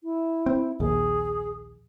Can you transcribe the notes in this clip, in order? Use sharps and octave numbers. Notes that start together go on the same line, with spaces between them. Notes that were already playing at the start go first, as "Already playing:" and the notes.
E4
C4
A#1 D#2 G#4